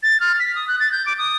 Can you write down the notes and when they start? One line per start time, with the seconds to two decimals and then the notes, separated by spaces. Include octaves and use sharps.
0.03 A6
0.20 F6
0.40 B6
0.55 D#6
0.68 F#6
0.80 A6
0.92 G6
1.06 D6
1.18 D#6